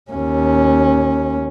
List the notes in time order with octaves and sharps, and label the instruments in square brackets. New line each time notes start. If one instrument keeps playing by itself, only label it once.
[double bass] D#2 C#4